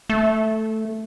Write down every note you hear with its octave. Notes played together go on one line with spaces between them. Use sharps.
A3